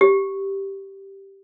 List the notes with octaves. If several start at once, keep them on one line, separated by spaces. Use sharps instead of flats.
G4